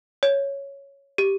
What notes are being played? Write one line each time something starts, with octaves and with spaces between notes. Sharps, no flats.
C#5
G4